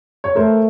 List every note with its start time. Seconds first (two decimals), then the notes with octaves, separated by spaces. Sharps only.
0.24 C#5
0.36 A3 A#4 C5